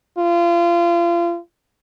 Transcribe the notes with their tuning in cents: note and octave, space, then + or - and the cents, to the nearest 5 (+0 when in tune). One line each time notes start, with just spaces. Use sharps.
F4 -30